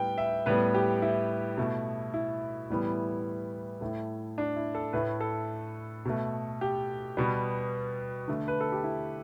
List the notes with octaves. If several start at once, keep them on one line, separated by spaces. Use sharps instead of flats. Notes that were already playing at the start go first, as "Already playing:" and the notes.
Already playing: A2 G3 B3 G5
E5
A2 G3 B3 B4
G4
E4
B2 A3
E4
A2 E3 G3 B3
A2 A3
D4
E4
A4
A2 A3 B4
A4
B2 A3
G4
B2 G3 B3
D3 A3
B4
A4
G4
E4